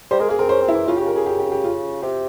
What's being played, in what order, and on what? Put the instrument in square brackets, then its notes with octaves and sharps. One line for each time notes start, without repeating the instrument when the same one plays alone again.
[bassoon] G3 [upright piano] C5
[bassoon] G#3 [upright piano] A#4
[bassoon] A#3 [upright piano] G#4
[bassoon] C4 [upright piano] A#4
[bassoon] C#4 [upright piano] C5
[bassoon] C4
[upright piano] E4
[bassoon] E3
[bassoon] C#3 [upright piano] F4
[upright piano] G4
[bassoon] C#3
[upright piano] A#4
[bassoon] C#3 [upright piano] G#4
[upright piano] G4
G4
G4
F4
[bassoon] C3 [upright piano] G4